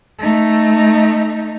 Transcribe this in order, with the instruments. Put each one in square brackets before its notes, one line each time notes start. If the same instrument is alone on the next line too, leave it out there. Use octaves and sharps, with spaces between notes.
[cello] A3 D#4